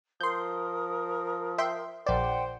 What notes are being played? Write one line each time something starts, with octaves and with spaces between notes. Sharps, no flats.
F3 A#4 C6 D#6 G6
E5 G5 C6
A#1 C5 D5 F#5 G5 C6